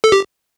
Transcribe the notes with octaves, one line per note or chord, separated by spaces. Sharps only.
A4
G4